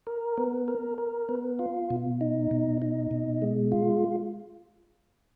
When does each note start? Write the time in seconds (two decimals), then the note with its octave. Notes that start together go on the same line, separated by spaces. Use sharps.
0.07 A#4
0.37 B3
0.68 A#4
0.98 A#4
1.29 B3
1.59 F4
1.90 B2
2.21 D#4
2.51 B2
2.82 D#4
3.11 B2
3.42 G#3
3.72 F4